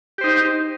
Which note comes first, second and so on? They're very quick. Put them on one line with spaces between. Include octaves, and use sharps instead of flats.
G4 C5 D#4